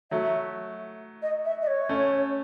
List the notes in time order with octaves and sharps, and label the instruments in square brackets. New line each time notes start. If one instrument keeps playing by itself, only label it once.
[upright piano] F#3 A3 [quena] E5
[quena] D#5
E5
D#5
C#5
[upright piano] A3 C#4